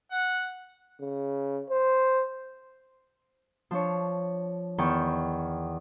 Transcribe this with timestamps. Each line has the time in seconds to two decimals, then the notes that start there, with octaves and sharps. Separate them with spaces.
0.11 F#5
1.01 C#3
1.70 C5
3.71 F3 D4 C#5
4.78 E2 D#3 G5 C#6